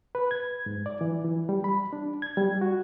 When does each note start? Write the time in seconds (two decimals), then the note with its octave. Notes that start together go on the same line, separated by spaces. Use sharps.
0.15 B4
0.31 G#6
0.66 G#2
0.86 D5
1.01 E3
1.24 E3
1.49 G3
1.64 B5
1.93 D4
2.22 G#6
2.37 G3
2.61 F#4